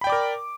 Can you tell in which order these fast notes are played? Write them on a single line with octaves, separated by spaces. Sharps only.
B5 G5 D5 D6 A#4